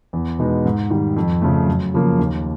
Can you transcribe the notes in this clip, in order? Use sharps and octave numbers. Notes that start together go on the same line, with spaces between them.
E2
B2 G#3 B3 D#4
G#2
D#3 G3
F2
C#3 F3 A3
F#2
C#3 F3 A#3
D#2